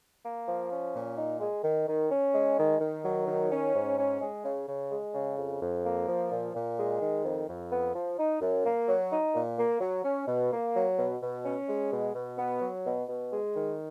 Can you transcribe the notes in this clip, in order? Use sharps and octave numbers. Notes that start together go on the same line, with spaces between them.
A#3
F3
C#4
A#2
D#4
G#3
D#3
D#3
C#4
G#3
D#3
D#3
F#3
D#3
C#4
G#2
C#4
G#3
C#3
C#3
G#3
C#3
F2
F2
A#3
F3
A#2
A#2
G#3
D#3
F2
F2
B3
F3
D#4
F#2
A#3
F#3
D#4
A#2
A#3
F#3
C#4
B2
A#3
F#3
B2
B2
C#4
G#3
B2
B2
B3
F#3
B2
B2
G#3
D#3